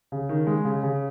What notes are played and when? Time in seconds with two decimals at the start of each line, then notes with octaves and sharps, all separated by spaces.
0.12 C#3
0.29 D#3
0.47 G#3
0.65 C#3
0.83 C#3